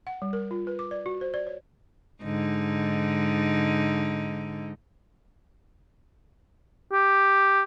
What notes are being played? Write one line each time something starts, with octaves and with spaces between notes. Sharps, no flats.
F#5
G3
A#4
F4
B4
D6
D5
F#4
C5
D5
C#5
G#2 D3 D#4
G4